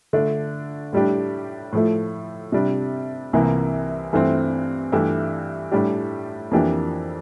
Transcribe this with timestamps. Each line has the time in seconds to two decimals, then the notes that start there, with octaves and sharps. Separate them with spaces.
0.13 D3 A3 D4
0.93 A2 G3 D4 G4
1.73 A2 F3 A3
2.52 C3 G3 D4 G4
3.33 C2 C3 E3 A#3
4.13 G2 E3 A3 C4
4.92 G2 E3 A3 E4 G4
5.72 A2 G3 D4 G4
6.51 F2 E3 A#3 D4 G4